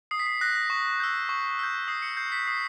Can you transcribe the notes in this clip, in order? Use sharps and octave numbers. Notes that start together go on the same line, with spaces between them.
D#6 C7
B6
C7
F#6 A#6
A#6
C#6
E6 G6
C#6
E6 G6
D#6 C7
C#7
G6 C7
B6
D#6 C7